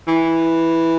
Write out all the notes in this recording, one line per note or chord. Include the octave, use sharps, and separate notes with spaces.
E3